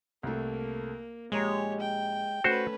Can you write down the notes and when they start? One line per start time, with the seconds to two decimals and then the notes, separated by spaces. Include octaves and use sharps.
0.23 C2 A3 A#3
1.32 A#1 G#3 G4 C#5 A#5
1.80 G5
2.44 A3 C#4 F#4 B4 C5